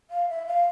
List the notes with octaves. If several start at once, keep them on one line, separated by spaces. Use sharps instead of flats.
F5
E5
F5